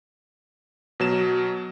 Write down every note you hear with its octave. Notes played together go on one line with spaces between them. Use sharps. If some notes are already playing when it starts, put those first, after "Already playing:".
B2 F#3 E7